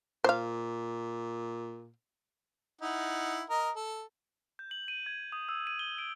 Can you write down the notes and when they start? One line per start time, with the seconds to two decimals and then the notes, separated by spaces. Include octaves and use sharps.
0.24 A#2 C5 F5
2.81 D#4 E4 F#5
3.50 A#4 D#5
3.76 A4
4.59 G6
4.71 F#7
4.88 D#7
5.06 G#6
5.32 D#6
5.49 E6
5.67 D#7
5.79 G7
5.98 D7